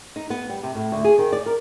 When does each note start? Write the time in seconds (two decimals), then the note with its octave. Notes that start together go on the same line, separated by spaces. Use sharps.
0.16 D#4
0.30 B3
0.49 G3
0.63 C3
0.75 A2
0.92 D2
1.05 G#4
1.18 D#3
1.33 D5
1.46 A#4